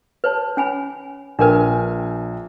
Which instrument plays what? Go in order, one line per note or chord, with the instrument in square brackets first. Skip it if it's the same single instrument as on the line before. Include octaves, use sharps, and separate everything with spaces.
[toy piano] B4 C#5 A5
C#4 G#5 B5
[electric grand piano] A#1 G5 G#5 [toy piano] D4 A#4 B4